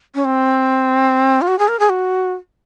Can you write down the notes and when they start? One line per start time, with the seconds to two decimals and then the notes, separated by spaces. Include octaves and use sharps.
0.15 C#4
0.25 C4
1.41 F4
1.48 F#4
1.59 G#4
1.68 A#4
1.79 G#4
1.89 F#4